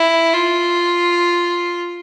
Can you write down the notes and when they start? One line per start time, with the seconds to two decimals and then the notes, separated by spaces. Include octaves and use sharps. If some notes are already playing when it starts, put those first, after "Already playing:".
Already playing: E4
0.34 F4